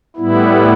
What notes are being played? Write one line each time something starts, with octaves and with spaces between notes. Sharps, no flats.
A2 G3 B3 E4